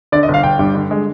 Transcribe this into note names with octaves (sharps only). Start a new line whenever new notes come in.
D3 D5
D#5
G1
F5
G1 G5
G2
D3
G#3